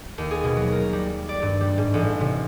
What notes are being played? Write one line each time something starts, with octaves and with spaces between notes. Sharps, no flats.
D#2
G#4
B2
F#3
A#4
G3
D5
G2
G3
G#2
A1
C3